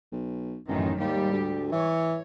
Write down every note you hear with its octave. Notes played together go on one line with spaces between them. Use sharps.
B1
A1 F#2 A2 D#3
D#2 G#2 G3 G4
D2
E3 C#5